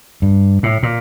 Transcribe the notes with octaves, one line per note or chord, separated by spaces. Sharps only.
G2
A2
A#2